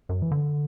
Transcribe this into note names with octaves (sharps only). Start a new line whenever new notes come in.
F#2
E3
D3